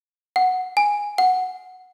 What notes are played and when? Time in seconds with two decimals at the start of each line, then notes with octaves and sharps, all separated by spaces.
0.36 F#5
0.77 G#5
1.18 F#5